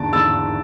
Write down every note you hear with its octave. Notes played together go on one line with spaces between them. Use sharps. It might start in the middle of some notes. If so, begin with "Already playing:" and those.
Already playing: E2 D3 A5 A6 D7
E2 E6 A6